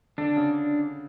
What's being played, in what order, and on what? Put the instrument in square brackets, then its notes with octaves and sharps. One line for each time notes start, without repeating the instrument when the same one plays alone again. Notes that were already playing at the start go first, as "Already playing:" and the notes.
[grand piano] D3 [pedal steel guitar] D4
[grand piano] C#3